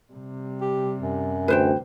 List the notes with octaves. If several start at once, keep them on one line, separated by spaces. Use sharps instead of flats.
C3 G3
G4
F#2
D2 B4 C5 G5